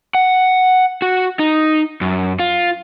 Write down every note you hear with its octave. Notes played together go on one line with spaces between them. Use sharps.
F#5
F#4
D#4
F#2
F4